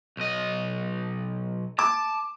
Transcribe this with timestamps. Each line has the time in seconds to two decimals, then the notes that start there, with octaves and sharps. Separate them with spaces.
0.17 B1 D#5
1.79 A5 D6